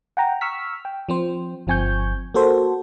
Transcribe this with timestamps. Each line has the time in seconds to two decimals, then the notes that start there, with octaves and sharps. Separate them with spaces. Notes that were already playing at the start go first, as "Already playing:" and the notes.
0.17 F#5 G5 A#5
0.41 C#6 E6 F6 B6
0.85 G5
1.09 F3 C4 C5
1.67 G1 F3 C4 G#5 C#6 G6
2.34 A#3 F#4 A4 C5